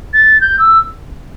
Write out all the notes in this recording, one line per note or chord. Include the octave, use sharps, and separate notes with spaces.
A6
G6
E6